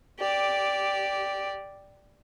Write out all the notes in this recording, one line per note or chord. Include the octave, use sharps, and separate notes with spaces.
G4 D5